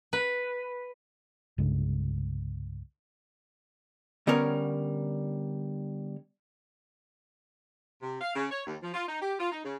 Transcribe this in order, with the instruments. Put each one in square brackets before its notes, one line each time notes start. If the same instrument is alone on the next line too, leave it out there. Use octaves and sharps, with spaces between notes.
[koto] B4
[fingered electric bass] C2 G2 C#3 G#3
[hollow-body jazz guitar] D3 G3 B3 C#4 A#4 C#5
[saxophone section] C3
F5
C#3
C#5
D#2
F3
F4
D#4
G4
F4
D#4
C#3